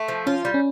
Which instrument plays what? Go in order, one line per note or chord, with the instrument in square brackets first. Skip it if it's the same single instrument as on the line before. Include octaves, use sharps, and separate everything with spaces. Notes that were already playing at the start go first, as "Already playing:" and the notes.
Already playing: [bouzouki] A3
F3
[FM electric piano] C#4 [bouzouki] F4
[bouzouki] G3
[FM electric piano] C#4